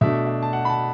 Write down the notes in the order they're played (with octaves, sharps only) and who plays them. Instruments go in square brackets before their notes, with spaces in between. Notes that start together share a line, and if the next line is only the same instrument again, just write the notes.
[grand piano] B2 A3 D4 E5
E5
A5
F#5
B5
A5